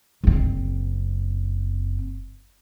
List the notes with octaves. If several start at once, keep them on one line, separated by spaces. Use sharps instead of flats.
F#1 C4